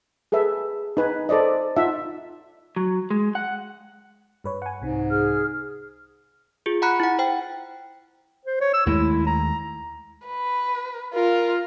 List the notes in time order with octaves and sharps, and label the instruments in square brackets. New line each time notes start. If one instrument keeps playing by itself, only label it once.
[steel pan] G#4 A4 B4 E5
D#4 B4 G#5
A4 C5 D5 D#5
D#4 F4 E5 F#5 A5
[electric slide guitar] F#3
G#3
F#5
[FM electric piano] G2 B4 C#5
F#5 G#5
[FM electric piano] C2 C3 [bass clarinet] G#2
[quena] G#4 [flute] F6
[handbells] F4 G#4
F#5 A#5 B5 F#6 C#7
E4 F#5
C5 G5
[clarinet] C5
C#5
E6
[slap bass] D#2 G#3 A3 [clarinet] E4
[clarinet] A#5
[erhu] B4
[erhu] F4 [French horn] A#4